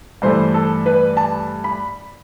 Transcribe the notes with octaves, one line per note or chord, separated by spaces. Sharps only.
G2 E3 A3 C5
A4
B4
A5
B5